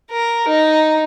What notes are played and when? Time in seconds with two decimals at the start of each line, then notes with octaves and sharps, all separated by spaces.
0.11 A#4
0.47 D#4